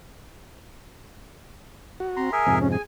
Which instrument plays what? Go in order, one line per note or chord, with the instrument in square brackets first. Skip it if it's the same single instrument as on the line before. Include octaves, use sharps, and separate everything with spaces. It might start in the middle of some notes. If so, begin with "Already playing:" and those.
[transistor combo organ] F#4
[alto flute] C4 [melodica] A#5 C6
[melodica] G#4 A#4 E5 [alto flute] G#5
[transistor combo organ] F2 G#2 C3
[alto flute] C#4
[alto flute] G#4 [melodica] G#5